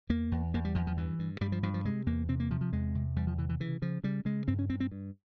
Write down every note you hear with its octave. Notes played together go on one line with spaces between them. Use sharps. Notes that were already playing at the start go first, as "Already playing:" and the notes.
E2 A#3
E2
E2 A#3
G3
E2 F3
F3
G2 E3
G2
G2 G3
F3
G2 F3
F3
C3 G#3
E2 A#3
C3 C4
A#3
C3 F3
F3
E2 G#3
C3
E2 G3
F3
C3 E3
E3
C#3 E3
C#3 F3
C#3 G3
C#3 G#3
G2 C4
C#4
G2 C4
C4
G2